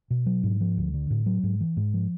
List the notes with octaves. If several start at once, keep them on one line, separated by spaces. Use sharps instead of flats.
B2
F#3
G#2
F3
D2
D3
A2
F#3
G#2
E3
G#2
F3